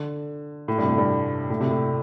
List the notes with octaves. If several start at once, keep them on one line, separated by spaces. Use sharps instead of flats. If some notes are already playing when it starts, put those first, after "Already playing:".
Already playing: D3
A2
G2 C3
A2
G2
A2
C3
A2